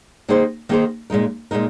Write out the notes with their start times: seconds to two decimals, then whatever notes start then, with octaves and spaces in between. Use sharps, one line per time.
0.28 D#3 A#3 D#4 G#4 C5
0.69 D#3 A#3 D#4 G#4 C5
1.10 A#2 G#3 D#4 A#4
1.51 A#2 G#3 D#4 A#4